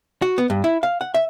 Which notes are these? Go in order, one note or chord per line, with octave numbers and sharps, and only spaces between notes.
F#4
B3
G2
E4
F5
F#5
E5